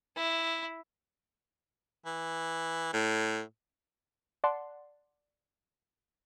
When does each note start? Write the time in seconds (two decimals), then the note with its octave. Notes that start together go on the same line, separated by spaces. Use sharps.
0.17 E4
2.06 E3
2.93 A2
4.44 D5 F#5 A5 C6